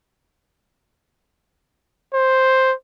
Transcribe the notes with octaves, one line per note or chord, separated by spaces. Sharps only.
C5